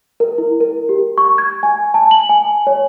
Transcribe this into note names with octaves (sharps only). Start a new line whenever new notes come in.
A#4
E4
A#4
G4
C#6
G#6
G#5
A5
F#7
G#5
C#5